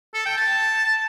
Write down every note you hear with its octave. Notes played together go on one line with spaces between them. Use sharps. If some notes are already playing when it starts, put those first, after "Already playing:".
A4
G5
A5